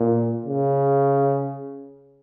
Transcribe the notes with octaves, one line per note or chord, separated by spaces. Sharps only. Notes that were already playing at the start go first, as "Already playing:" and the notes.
Already playing: A#2
C#3